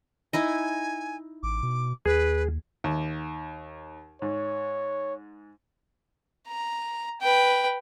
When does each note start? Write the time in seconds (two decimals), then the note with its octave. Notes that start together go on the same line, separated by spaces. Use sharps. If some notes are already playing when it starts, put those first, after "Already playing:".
0.33 D#4 E4 D#5 G#5
1.43 A1 D6
1.63 B2
2.06 D#2 G#4 B4
2.84 D#2
4.22 G#2 C#5
6.48 A#5
7.21 B4 G5